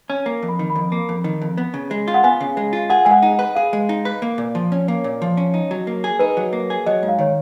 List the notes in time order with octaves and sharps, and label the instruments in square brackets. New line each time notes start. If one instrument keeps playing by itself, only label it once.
[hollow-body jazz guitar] C#4
[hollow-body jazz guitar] A#3 [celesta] A#5
[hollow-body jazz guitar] F2
[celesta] B5
[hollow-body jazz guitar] D#3
[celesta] B5
[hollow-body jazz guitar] F2
A#3
F2
D#3
F2
B3
C#3
G#3
F4
[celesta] F#5
[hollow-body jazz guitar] B3 [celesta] G#5
[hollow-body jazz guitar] C#3
G#3
F4
[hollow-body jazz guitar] G#4 [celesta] F#5
[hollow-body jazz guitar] G#3 [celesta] G#5
[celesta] F#5
[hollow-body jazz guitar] D#4
[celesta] F#5
[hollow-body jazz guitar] B4
[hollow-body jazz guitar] G#4 [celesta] F5
[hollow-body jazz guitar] G#3
D#4
B4
A#3
A#2
F3
C#4
[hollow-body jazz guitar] A#3 [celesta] C#5
[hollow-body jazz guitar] A#2
F3
C#4
D#4
F#3
A#3
G#4
[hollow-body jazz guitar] D#4 [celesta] B4
[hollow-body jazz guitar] F#3
A#3
G#4
[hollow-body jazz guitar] F#3 [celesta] D#5
[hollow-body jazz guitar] G#2
[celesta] F5
[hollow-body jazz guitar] D#3 [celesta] C#5